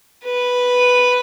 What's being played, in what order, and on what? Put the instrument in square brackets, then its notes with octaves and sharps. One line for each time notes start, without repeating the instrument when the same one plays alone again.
[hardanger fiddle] B4